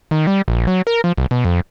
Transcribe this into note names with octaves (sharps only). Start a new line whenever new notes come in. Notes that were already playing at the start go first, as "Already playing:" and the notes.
D#3
G3
A#1
F#3
A#4
F3
C2
B2
F2